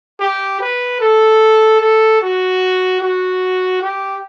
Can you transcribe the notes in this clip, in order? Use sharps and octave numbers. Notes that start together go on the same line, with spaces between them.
G4
B4
A4
A4
F#4
F#4
G4